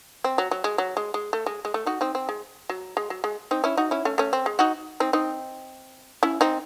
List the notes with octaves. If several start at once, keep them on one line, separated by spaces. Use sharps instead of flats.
C4
F#3
F#3
G#3
F#3
G#3
G#3
A3
G#3
G#3
A3
D#4 F#4
C4 D#4
C4
G#3
F#3
G#3
F#3
G#3
C4 D#4
C#4 E4
D#4 F#4
C#4 E4
A3 C#4
A3 C#4
C4
G#3
D#4 F#4
C4 D#4
C4 D#4
C#4 E4
C4 D#4